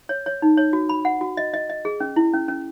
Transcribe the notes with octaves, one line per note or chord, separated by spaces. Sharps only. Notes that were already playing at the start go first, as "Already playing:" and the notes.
C#5
C#5
D#4
C#5
F#4
B5
F#5
F#4
D#5
D#5
D#5
G#4
C#4
E4
C#4
C#4